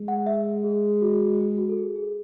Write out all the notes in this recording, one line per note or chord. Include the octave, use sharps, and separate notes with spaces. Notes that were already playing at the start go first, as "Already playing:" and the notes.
Already playing: G#3
F#5
E5
G#4
F#4
G#4
F#4
A4
G#4
G#4